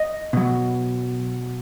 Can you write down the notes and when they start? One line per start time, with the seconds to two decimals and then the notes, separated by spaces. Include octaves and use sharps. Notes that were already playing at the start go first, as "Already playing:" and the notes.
Already playing: D#5
0.33 B2 F#3